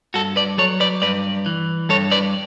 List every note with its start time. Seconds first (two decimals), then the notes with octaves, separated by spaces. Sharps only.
0.14 G2 F#4 A4
0.36 B4 D5
0.58 F#3 A4 C#5
0.80 B4 D5
1.02 G2 B4 D5
1.46 E3
1.89 G2 A4 C#5
2.12 B4 D5